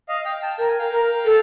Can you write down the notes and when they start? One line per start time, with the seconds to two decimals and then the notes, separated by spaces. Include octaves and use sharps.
0.08 D#5 F5
0.25 F5 G5
0.42 G5 A5
0.58 A#4 G5
0.68 G#5
0.78 F5 G5
0.91 A#4
1.25 A4